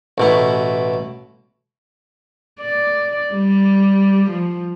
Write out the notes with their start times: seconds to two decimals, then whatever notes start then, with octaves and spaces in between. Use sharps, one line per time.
0.18 A1 B2 E4
2.60 D5
3.33 G3
4.31 F3